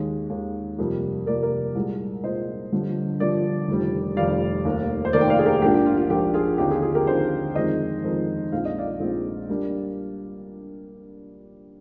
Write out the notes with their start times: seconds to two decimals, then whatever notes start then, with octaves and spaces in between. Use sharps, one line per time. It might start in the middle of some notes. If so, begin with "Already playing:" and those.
Already playing: D#2 D#3 G#3
0.30 D#2 D#3 G#3
0.78 F2 C3 G3 A#3
1.26 F2 C3 G3 A#3 A#4 D5
1.43 A#4 D5
1.75 C2 A#2 G#3
2.24 C2 A#2 G#3 C5 D#5
2.72 G1 G2 D3 F3
3.20 G1 G2 D3 F3 A#4 D5
3.68 F1 F2 D#3 G3
4.17 F1 F2 D#3 G3 D5 F5
4.65 F1 D#2 D#3 A#3
5.05 C5
5.13 F1 D#2 D#3 A#3 A#4 D5
5.21 G5
5.30 D5 F5
5.39 G#4
5.46 G4 A#4
5.62 A#1 G#2 F3 A#3 D4 G4
5.74 G4
5.86 F4
5.98 F4
6.10 A#1 G#2 F3 A#3 D4 G4
6.34 F4 G#4
6.58 D#2 D3 F3 C4 D#4 G4
6.70 F4 G#4
6.82 F4 G#4
6.95 G4 A#4
7.06 D#2 D3 F3 C4 D#4 G#4 C5
7.55 F2 D#3 G#3 C4 D#4 C5 D#5
8.04 F2 D#3 G#3 C4 D#4
8.51 A#1 A#2 G#3 C4 D#4 F5
8.65 D#5
8.79 D5 F5
9.00 A#1 A#2 G#3 C4 D#4
9.50 G3 A#3 D4